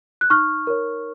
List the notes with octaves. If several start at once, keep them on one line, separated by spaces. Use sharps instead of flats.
F#6
D#4 C#6 F6
A#4 C#5